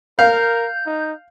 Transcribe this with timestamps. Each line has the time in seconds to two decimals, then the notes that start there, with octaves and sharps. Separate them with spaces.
0.19 A#4 F5 G6
0.86 D#4